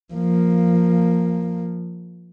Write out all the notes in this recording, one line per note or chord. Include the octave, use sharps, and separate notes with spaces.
F3 A#3